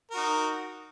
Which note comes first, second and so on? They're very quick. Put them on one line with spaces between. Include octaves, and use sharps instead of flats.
A#4 F#4 D#4